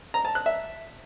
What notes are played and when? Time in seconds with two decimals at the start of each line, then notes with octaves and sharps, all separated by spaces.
0.14 A#5
0.25 A5
0.35 F#6
0.46 E5